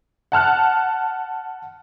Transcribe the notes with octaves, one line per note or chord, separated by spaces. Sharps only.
F#5 A5 F6 F#6